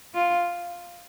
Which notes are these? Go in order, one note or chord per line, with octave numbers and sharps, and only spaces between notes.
F4